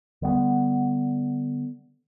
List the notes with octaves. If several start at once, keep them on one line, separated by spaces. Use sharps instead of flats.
D3 G3 B3